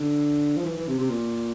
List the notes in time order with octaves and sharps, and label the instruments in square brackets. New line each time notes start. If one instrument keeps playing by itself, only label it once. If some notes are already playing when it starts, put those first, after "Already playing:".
Already playing: [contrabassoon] D3
F3
E3
E3
C3
C3
A#2